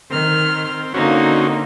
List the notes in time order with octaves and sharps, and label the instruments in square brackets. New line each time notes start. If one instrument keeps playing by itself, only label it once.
[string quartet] D#3 F6 [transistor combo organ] C4
[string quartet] D3 A#3 D#4 [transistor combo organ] C4 C#4 F#4